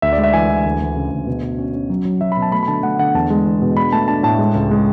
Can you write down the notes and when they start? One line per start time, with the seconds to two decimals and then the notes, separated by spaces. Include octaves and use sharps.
0.02 D2 E5
0.13 D5
0.18 G#3
0.23 E5
0.33 E3 G#5
0.50 E3
0.66 D2
0.80 D2
0.96 C#3
1.11 D2
1.27 B2
1.43 B2
1.59 C#4
1.74 C#4
1.90 F#3
2.05 F#3
2.21 F#3 E5
2.32 B2 B5
2.42 A5
2.52 A3 B5
2.63 B5
2.68 D3 A5
2.83 A3 F#5
2.99 D3 F#5
3.14 E2 A5
3.30 G#3
3.45 E2
3.62 B2
3.77 D4 B5
3.93 A3 A5
4.08 D4 A5
4.23 A2 A5
4.39 G#3
4.55 C#2
4.71 G#3